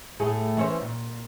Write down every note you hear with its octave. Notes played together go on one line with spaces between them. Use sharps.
A2 A3 G#4
E3 C#4 C5
A#2